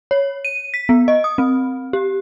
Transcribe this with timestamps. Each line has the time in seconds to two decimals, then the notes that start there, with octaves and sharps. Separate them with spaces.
0.11 C#5
0.45 D#7
0.74 B6
0.89 B3
1.08 D#5
1.24 D#6
1.38 C4
1.93 G4